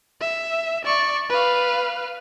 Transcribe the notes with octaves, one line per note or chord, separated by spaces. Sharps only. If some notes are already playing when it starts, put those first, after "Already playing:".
E5
D5 C#6
B4 F5